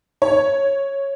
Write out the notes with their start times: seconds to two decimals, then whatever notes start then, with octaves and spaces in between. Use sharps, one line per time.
0.22 C#5